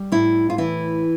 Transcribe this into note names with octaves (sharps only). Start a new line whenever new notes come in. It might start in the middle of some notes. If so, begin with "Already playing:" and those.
Already playing: G3
A2 E4
F4
E3 E4